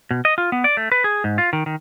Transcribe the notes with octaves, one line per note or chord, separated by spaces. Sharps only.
B2
D#5
F4
B3
D5
A3
B4
G#4
G#2
F4
D#3
D#3